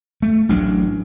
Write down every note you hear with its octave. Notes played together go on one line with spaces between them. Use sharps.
A3
A1 F#3 D4